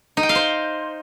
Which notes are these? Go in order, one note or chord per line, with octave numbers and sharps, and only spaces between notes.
D#4
G5
F5
C5